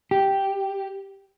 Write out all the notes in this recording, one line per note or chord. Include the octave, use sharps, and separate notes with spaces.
G4